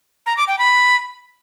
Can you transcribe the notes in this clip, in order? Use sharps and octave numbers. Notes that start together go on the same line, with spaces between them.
A#5
D6
G5
B5